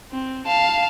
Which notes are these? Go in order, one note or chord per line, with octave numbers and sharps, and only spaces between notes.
C4
F5 A5